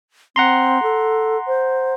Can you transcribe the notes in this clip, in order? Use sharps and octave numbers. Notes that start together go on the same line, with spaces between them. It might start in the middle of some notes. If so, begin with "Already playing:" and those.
C4 F#5 A#5 C6
A4
C5